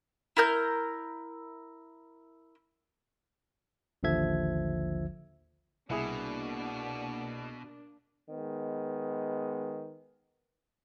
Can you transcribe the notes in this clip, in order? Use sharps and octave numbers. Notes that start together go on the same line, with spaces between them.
E4 A#4 G6
A1 D#2 D3 F3 E5 G#6
C2 B2 A#3 D4 E4 G#4
D#3 G#3 B3